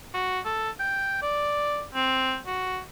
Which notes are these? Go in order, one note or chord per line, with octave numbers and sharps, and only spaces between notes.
F#4
A4
G5
D5
C4
F#4